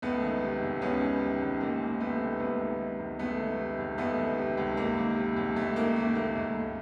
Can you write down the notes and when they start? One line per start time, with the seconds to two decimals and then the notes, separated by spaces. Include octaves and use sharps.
0.02 C#2 A3 B3
0.22 D#3
0.42 C3
0.62 C#2
0.81 C#2 B3 C#4
1.01 D#3
1.21 C3
1.41 C#2
1.60 C#2 A#3 C4
1.80 D#3
2.00 C3 A3 B3
2.21 C#2
2.39 C#2 A3 B3
2.60 D#3
2.79 C3
2.99 C#2
3.19 C#2 A3 B3
3.39 D#3
3.58 C3
3.78 C#2
3.98 C#2 A3 B3
4.18 D#3
4.38 C3
4.57 C#2
4.77 C#2 A#3
4.97 D#3
5.17 C3
5.36 C#2
5.56 C#2 A3
5.76 D#3 A#3
5.96 C3 A3
6.15 C#2 A#3
6.35 C#2 A3
6.55 C#2